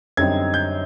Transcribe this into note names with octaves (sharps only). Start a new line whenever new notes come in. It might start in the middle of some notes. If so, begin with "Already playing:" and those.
F#2 D3 G3 C4 D#4 G#6
G6